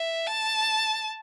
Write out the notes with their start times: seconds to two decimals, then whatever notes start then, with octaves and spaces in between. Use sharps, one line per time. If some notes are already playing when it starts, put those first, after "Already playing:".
Already playing: E5
0.27 A5